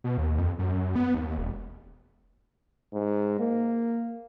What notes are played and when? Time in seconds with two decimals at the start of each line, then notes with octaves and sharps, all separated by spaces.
0.04 B2
0.18 D#2
0.39 F2
0.59 F#2
0.96 B3
1.15 D#2
1.38 E1
2.94 G#2
3.40 A#3